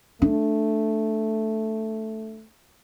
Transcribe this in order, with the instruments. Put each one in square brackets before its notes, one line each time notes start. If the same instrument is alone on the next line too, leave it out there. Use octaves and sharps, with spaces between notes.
[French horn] A3 [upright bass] D4